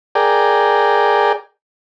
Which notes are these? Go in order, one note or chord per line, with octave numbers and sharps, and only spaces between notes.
G#4 A#4 D5 G5